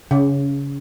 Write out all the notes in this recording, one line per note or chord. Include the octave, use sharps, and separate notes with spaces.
C#3